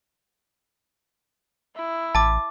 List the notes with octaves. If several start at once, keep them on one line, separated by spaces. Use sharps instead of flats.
E4
A1 A5 D6 A6